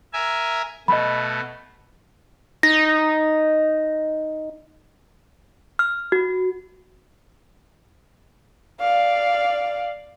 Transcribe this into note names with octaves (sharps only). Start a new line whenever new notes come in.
A#4 E5 G#5
B2 A3 D#5 B5
D#4 A#6
F6
F#4
D5 F5